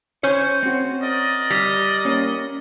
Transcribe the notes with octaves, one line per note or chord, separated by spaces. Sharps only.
C#4 C5 C#5
C4 F#4
A#4 D5 D#5
G3
A#3 C#4